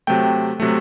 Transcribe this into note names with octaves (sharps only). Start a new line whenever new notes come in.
C3 F#3 A3 G5
C3 F#3 A3